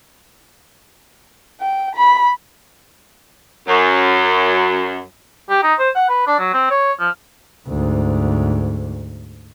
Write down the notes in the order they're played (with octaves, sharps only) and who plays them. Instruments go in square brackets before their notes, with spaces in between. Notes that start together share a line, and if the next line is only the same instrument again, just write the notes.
[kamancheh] G5
B5
[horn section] F#2
[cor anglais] G4
D#4
C5
F#5
B4
D4
F#3
C4
C#5
F3
[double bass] D2 G#2